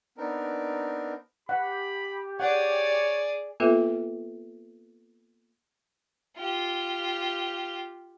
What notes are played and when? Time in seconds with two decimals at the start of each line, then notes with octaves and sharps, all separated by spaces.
0.18 B3 C4 D4 D#4 A#4
1.49 G4 F#5 B5
2.40 G#4 C#5 D5 F#5
3.60 A#3 B3 F4 A4 B4 E5
6.38 F4 G4